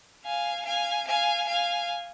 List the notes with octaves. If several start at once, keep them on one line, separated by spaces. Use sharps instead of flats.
F5 G#5
F5 G#5
F5 G#5
F5 G#5